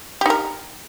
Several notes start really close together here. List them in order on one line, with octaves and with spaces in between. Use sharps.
G4 D#4 A#4